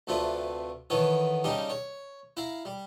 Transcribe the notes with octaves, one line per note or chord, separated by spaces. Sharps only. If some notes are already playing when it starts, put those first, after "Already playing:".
D2 C3 A3 D4 F4 B4
D#3 E3 B3 A4 C#5
C#3 G3 D4 D#4 G4
C#5
E4 F5 A#5
G3